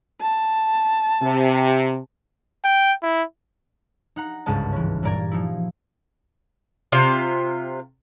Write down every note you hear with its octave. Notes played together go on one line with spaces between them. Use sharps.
A5
C3
G5
E4
D#4 F#5 A#5
G1 C#2 G#2 G#3 D#5 A5
E3 C#4
G2 A#2 A#4 D5 A#5 G#6
F3 D#4 E4
C3 F4 E5